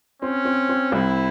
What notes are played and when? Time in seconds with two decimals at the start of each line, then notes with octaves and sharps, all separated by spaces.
0.22 C4 C#4
0.45 C4
0.69 C4
0.92 C2 E4